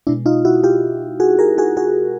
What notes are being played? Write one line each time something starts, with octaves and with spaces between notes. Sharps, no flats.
B2 G#3 D4 E4
D#4 F4
E4 F#4
F4 G4
F#4 G#4
G#4 A#4
F#4 G#4
F#4 G#4